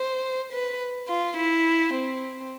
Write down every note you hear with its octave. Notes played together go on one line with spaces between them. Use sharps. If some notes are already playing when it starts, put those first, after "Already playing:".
Already playing: C5
B4
F4
E4
C4